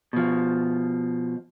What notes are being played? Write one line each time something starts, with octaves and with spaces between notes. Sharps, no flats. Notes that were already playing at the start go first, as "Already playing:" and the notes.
B2 F3